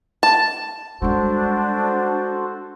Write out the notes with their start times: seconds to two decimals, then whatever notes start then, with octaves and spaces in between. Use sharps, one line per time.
0.23 A5
1.02 G3 G#3 D4 F#4 A4 C5